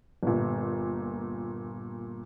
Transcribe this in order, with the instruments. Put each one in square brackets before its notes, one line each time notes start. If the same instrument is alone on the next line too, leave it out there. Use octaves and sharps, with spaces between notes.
[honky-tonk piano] G1 A#2